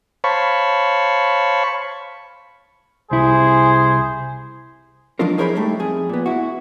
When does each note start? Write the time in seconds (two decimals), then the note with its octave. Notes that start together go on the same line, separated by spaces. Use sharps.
0.24 C5 C#5 F5 A5 B5 C#6
3.11 C2 E4 G#4 C5
5.19 F3 F#3 D4 D#4 F4 A#4
5.38 E4 G#4 A#4 C5 C#5 B5
5.55 G3 A3 D#4
5.79 F2 G#4
6.09 A#2 B3
6.26 E4 F#4